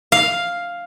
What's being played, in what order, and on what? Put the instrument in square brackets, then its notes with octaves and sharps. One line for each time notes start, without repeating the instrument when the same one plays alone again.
[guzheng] F5